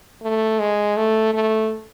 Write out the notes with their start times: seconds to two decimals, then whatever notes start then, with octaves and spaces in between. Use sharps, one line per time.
0.23 A3
0.60 G#3
0.97 A3
1.34 A3